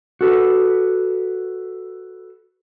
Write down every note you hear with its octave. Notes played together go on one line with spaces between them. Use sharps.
F#4 A4 B4